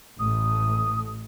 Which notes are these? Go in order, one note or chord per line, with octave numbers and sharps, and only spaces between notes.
A1 A3 D#6